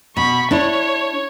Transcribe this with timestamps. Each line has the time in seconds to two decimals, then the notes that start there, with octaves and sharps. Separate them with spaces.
0.17 B2 B5 C#6
0.51 D4 E4 C#5